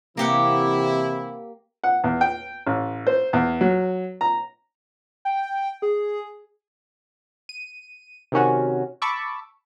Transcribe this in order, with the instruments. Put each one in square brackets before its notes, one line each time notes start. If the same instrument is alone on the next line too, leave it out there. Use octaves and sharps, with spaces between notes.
[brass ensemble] C3 E3 E4 [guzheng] A#3 G4 F#5
[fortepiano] F#5
E2
G5
A1
C5
E2
F#3
A#5
[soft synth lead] G5
G#4
[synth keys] D#7
C3 D#3 C#4 F#4
A5 B5 C#6 D6 E6